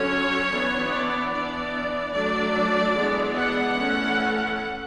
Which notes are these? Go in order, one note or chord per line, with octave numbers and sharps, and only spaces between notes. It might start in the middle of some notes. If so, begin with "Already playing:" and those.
Already playing: D3 F#3 C#4 C#5
E3 B3 D4
D5
E3 B3 D4 D5
F#3 A3 D4 D5
E3 G#3 B3 D4
F#5
E3 A3 C#4